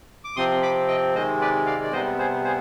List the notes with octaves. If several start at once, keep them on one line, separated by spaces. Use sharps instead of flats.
D6
C3 F3 C4 C6 D#6
B5 D6
D#5 G5
C3 D#3 G#3 C5 D#5
B4 D5
D5 F5
D5
C3 G3 B3 C5 D#5
G#4 C5
G#4 C5